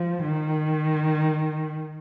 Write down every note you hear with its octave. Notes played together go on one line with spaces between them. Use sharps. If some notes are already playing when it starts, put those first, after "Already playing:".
Already playing: F3
D#3